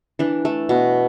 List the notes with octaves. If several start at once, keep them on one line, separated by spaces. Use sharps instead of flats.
E3 D4
A3
B2